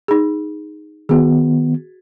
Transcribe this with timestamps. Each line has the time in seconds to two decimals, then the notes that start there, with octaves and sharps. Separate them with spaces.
0.08 D#4 G#4
1.09 D#3 B3 F#4 G#4